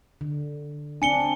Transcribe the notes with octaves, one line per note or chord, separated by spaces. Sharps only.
D3
C4 D4 G#5 C#7 G7